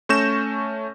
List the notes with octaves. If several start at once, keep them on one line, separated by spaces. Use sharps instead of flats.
A3 C#4 C#6 G6 A#6 E7